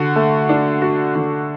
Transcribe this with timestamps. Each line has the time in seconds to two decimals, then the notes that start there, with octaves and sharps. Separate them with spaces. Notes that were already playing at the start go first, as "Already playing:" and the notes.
Already playing: D3 F#4
0.16 A3
0.49 D4
0.82 F#4
1.15 D3